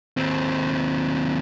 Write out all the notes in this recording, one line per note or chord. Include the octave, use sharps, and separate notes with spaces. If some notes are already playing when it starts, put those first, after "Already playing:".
D#2 C4